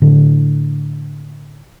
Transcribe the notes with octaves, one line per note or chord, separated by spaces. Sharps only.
A2 D3